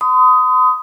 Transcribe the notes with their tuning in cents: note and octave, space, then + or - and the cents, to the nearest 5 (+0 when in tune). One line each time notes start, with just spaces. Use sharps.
C6 -45 D#6 +10